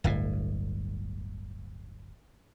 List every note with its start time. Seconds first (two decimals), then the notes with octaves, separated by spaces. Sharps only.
0.04 D1 G1 A2